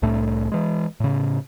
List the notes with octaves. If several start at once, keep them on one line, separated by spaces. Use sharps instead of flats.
C2 A2 A3 D4
E3 G#3
A2 C#3